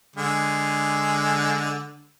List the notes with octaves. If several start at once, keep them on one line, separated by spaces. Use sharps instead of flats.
D3 G#3